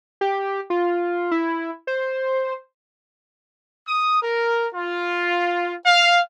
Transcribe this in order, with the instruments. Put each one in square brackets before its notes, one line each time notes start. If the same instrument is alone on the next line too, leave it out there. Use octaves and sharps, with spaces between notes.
[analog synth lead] G4
F4
E4
C5
[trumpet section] D#6
A#4
F4
F5